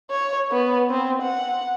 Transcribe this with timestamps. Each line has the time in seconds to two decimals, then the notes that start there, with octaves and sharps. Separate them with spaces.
0.10 C#5
0.51 B3
0.90 C4
1.22 F#5